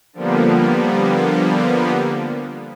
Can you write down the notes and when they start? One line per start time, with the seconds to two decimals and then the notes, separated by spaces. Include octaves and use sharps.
0.13 D3 F3 G3 A#3 B3